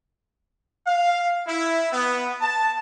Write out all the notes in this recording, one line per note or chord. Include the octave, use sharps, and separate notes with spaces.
F5
E4
B3
A5